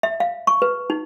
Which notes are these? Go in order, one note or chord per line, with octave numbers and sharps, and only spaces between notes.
E5
F5
C#6
B4
D#4